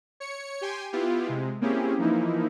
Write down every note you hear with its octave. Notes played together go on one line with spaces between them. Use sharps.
C#5 C#7
G4 G5 G#5 C6
B3 E4 F4 G4
C3 G#3
A#3 C4 C#4 E4 G4 G#4
E3 F3 A#3 D#4 E4